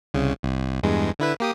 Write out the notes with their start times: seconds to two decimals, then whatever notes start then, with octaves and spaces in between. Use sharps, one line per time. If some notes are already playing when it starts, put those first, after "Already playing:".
0.14 C2 C#3
0.43 C2
0.83 E2 G2 G#3
1.19 D3 E4 B4
1.40 A#3 G4 D#6